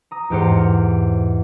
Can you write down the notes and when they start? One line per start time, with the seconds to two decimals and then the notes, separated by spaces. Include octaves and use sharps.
0.11 A#5 D#6
0.30 E2 G#2 G4 C5 F6 C#7